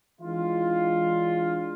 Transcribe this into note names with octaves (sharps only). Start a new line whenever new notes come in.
E3 G#3 D4 F4